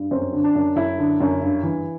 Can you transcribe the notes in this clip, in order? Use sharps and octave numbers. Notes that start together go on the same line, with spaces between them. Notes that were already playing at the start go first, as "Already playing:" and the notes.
Already playing: G2
F#2 C4
D3
D4
F#2
F#2 E4
D3
F#2
G2
E3